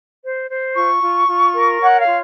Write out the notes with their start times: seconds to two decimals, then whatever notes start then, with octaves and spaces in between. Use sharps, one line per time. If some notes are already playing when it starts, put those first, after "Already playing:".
0.23 C5
0.50 C5
0.76 F4 C#6
1.03 F4
1.28 F4
1.54 A#4
1.80 C#5 F#5
1.99 F5
2.07 F4